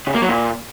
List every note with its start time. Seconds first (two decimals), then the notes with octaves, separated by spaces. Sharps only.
0.07 C#3
0.14 A#3
0.22 F#3
0.29 A#2